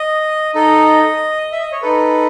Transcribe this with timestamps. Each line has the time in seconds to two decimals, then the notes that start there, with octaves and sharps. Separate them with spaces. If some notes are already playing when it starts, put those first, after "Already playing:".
Already playing: D#5
0.55 D#4 A4 D#5
1.52 E5
1.62 D#5
1.72 C#5
1.82 D#4 A4 B4